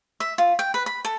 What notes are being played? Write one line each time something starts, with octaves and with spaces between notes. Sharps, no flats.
E5
F4
G5
B4
B5
A4